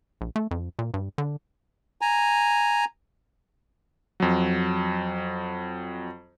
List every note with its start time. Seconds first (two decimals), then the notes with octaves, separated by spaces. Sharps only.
0.21 A#1
0.36 A3
0.51 F2
0.79 A#2
0.94 G2
1.18 D3
2.01 G#5 A#5
4.20 F2 F#3